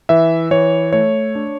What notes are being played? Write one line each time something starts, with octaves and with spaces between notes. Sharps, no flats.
E3 E5
E3 C#5
A3 C#5
D4